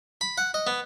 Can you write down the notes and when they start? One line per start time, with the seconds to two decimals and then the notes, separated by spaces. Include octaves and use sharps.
0.21 B5
0.38 F#5
0.54 D#5
0.67 B3